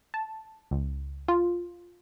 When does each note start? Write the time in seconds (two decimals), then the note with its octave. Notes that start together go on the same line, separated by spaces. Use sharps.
0.14 A5
0.71 C#2
1.28 F4